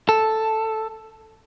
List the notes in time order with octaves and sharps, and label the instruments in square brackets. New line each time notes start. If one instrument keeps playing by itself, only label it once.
[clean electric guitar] A4